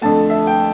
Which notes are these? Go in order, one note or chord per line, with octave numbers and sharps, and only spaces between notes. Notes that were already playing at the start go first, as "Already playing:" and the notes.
F2 D3 A3 A5
E5
G5